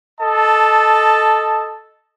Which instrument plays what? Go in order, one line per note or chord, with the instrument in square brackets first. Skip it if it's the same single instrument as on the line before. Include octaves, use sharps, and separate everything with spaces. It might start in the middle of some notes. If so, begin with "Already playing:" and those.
[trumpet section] A4 D#5 A5